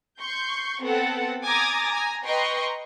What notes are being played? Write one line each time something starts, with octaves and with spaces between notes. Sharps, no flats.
C6 C#6 G6
B3 C4 A4 F#5 A5
G#5 A#5 D6 D#6 G#6 A6
G#5 A#5
B4 D#5 G5 A#5 C6 C#6